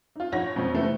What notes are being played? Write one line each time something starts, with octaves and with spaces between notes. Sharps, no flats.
D#4 F4
A#1 D#4 C#5 F#5 A#6
F2 B2 F3
C3 E3 A3 B3 C4